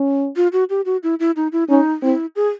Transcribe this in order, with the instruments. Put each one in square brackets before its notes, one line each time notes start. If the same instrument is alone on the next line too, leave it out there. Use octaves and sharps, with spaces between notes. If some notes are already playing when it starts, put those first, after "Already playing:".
Already playing: [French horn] C#4
[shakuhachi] F4
F#4
G4
F#4
E4
E4
D#4
E4
[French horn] C#4 [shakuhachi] D#4
[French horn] C4 [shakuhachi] E4
[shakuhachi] G#4